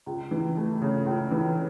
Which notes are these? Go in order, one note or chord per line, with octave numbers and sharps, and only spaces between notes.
C#2
E3
A3
C#3
C#2
E3